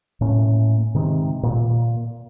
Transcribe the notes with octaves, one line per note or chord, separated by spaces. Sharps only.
A2 A3 A#3 C#4
G#2 C3 D#3
A#2